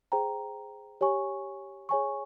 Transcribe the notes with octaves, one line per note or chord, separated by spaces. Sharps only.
G#4 C5 G5 A#5
G4 C#5 G#5 C#6
G#4 C#5 G#5 C#6